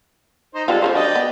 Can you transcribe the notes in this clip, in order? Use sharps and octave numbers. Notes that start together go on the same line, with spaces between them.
D#4 C5
G3 G#3 C4 F4 A4
C#4 G4 A#4 C5
F#3 D4 D5 D#5 G5
B3